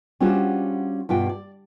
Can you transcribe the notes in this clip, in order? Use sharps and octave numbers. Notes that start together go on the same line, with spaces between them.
G3 C#4 D4 F4 F#4 C5
G2 B2 F4 G5
D5